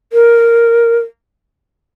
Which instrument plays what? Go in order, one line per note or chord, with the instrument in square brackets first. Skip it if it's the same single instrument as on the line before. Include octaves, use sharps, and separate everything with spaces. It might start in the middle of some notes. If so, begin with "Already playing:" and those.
[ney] A#4